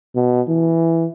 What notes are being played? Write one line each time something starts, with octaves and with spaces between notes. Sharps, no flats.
B2
E3